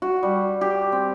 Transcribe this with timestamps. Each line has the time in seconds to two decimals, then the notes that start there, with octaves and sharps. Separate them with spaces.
0.02 F#4
0.23 G3
0.61 G4
0.92 C4